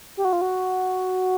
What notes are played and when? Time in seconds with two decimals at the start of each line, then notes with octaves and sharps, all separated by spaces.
0.17 G4
0.25 F#4
0.33 F4
0.41 F#4